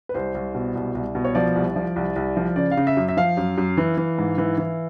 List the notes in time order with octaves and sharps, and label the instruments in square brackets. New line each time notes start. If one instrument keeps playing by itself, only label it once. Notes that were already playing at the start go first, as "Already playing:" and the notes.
[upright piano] B4
C2 C5
C2
B2
C2
C2
B2
C#5
F3 D5
C2
F3
C2
C2
F3
C#3 D5
F5
C#3
E5
F#2
E5
F3 F5
F#2
F#2
E3
E3
G#2
E3
E3